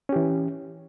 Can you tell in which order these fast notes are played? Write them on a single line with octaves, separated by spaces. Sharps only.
C#4 G4 E3